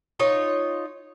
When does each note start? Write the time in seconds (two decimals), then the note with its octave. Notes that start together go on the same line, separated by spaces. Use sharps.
0.20 D#4 F4 C#5